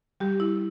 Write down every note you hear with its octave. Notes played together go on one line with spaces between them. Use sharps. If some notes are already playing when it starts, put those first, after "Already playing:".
G3 G4
E4